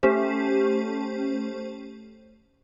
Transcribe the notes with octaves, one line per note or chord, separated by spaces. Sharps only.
A3 C#4 G4 C5